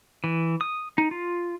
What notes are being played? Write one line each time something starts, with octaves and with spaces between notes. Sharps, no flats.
E3
D#6
D#4
F4